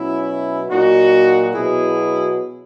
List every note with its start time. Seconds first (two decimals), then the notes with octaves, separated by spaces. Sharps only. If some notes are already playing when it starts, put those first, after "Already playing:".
Already playing: B2 F#3 C#4 E4
0.70 A#2 F#3 D#4 F#4
1.54 B2 F#3 E4 G#4